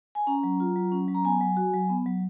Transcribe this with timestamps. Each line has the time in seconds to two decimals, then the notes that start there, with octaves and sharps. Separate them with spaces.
0.15 G#5
0.27 C#4 A#5
0.43 F#3
0.60 F4
0.76 F#3
0.92 C#4
1.08 F#3
1.14 A#5
1.24 B3 G#5
1.41 F#3
1.57 F#4
1.73 F#3
1.89 B3
2.06 F#3